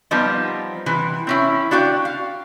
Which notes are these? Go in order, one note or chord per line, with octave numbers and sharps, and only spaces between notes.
F3 G3 B3 C4 D#4
C3 E3
C4 C#4 E4
D4 F#4 F5 G5
F5